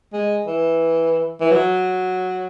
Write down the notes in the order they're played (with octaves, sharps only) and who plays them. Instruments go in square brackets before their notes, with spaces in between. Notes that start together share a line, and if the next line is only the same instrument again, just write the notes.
[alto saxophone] G#3
E3
E3
F#3